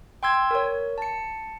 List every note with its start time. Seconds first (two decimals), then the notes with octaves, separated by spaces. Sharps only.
0.23 G5 C6 E6 G#6
0.51 A#4 C#5
0.98 A5 C#7